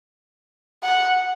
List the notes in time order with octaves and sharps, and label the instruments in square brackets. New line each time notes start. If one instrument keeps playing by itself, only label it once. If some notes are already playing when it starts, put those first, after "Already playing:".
[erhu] F#5